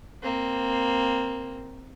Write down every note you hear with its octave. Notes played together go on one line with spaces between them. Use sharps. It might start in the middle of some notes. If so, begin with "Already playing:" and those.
A#3 C4